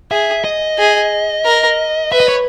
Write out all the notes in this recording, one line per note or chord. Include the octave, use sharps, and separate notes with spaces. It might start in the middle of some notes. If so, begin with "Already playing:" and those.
G#4 E5
D#5
G#4
A#4
B4 E5
D#5
C#5